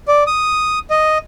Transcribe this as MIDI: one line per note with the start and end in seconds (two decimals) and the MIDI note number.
0.08 0.24 74
0.27 0.79 87
0.90 1.18 75